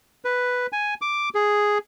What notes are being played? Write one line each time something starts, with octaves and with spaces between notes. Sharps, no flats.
B4
G#5
D6
G#4